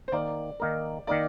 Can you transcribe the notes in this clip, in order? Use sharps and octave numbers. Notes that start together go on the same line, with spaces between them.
C5
D#3 A#3 D#4 A#4 D5
D#3 A#3 D#4 A#4
D#3 A#3 D#4 A#4 D5